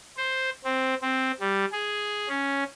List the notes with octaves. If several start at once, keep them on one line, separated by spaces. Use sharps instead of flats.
C5
C4
C4
G3
G#4
C#4